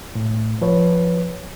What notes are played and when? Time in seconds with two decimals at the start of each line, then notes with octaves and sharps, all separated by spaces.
0.15 A2
0.61 F3 B4 C#5